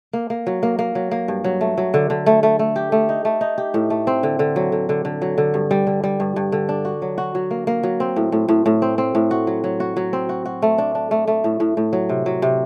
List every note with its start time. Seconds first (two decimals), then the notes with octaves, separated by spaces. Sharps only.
0.13 A#3
0.30 A#3
0.47 F#3
0.63 A#3
0.79 A#3
0.95 F#3
1.11 A#3
1.28 G2
1.44 F#3
1.61 A3
1.78 F#3
1.94 D3
2.10 D3
2.26 A3
2.43 A3
2.59 A3
2.76 G4
2.92 A3
3.09 D#4
3.25 A3
3.41 D#4
3.58 G4
3.74 A2
3.90 A3
4.07 C4
4.23 D3
4.39 D3
4.56 F#3
4.72 D3
4.89 D3
5.05 D3
5.22 F#3
5.38 D3
5.54 G2
5.71 G3
5.87 D3
6.03 G3
6.20 G2
6.36 G2
6.52 D3
6.69 D4
6.85 F#4
7.02 F#3
7.18 F#4
7.35 F#3
7.51 A#3
7.67 A#3
7.83 F#3
8.00 C4
8.16 A2
8.32 A2
8.49 A2
8.66 A2
8.82 C4
8.98 C4
9.15 A2
9.31 F#4
9.47 F#3
9.64 F#3
9.80 F#4
9.97 F#3
10.13 C4
10.29 F#4
10.46 F#4
10.62 A3
10.78 D4
10.95 D4
11.11 A3
11.27 A3
11.44 A2
11.60 A2
11.77 A2
11.93 F#3
12.09 C3
12.26 F#3
12.42 C3